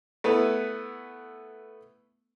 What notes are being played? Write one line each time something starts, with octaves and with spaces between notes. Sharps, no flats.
A3 B3 E4 B4